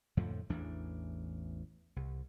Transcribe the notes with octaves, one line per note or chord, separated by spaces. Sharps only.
F2 A2 D3 F3
A1 E2 E3 D4
C2